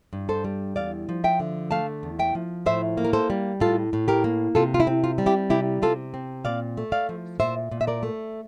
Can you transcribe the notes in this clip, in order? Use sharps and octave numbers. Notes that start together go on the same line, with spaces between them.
G2
A4 C5
G3
E2 D5 F5
F3
E5 G5
D3
A3 F5 A5
E2
E5 G5
F3
A2 C5 E5
A#3
A#4
A4 C5
G3
A2 F4 A4
A2
G4 A#4
A#3
C3 F4 A4
F4
E4
C4
F4
G3
E4 G4
C3 E4 G4
C3 F4 A4
C4
A#2 D5 F5
A3
D5 F5
F3
A#2 C5 E5
A#2
E5
A#4 D5
A3